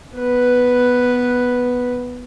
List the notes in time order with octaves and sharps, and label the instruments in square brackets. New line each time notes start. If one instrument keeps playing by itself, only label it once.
[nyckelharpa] B3 B4